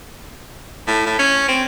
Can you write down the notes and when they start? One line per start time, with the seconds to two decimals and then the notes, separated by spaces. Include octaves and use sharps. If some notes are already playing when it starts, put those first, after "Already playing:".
0.87 A2
1.06 A2
1.19 C#4
1.48 C4